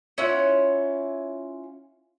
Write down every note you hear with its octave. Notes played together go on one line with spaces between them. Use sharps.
C#4 E4 F4 F#5